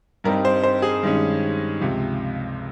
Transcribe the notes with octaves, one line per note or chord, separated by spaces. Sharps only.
G2 G3 C4 D#4 A#4
C5
C5
G#4
G2 D#3 G#3 C#4
C#2 C3 F3